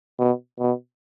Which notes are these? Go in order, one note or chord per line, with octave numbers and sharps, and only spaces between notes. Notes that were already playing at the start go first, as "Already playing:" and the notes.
B2
B2